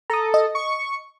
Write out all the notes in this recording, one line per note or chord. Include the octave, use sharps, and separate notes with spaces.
A4 A#5 D#6
D#5
C#6